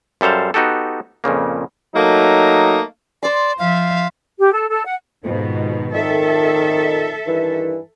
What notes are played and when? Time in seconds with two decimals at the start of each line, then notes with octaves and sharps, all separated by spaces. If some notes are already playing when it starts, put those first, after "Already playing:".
0.21 F#2 G3 A4 C5 F5
0.54 B3 D#4 F#4 G4 A4
1.24 F2 A#2 C#3 A#3
1.96 F#3 A3 A#3 D#4
3.23 C5 D5 C6
3.59 F3 E5 F5
4.38 G4
4.53 A4
4.69 A4
4.85 F#5
5.23 F2 G#2 B2 D#3
5.93 F2 A#2 D#3 A4 E5
7.26 G2 D#3 E3